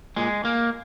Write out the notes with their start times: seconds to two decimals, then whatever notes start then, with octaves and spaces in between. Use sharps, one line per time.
0.16 A#2 G#3
0.45 A#3